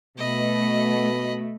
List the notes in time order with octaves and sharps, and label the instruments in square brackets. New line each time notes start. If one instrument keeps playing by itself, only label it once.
[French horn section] B2 [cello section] A3 [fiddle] D#5 B5